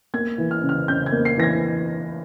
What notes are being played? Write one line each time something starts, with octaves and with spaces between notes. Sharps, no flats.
A#3 G#6
E3
F6
C#3
F6
C#3 G6
G#6
A#3
C7
E3 A#6
G#6